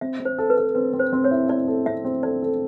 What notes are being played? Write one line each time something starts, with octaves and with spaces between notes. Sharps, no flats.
C4 E5
C4
C5
A4
B4
A4
C4 B4
C4
C5
C4
C#5
E4
E4 D5
A4
C4 E5
C4
A4 D5
A4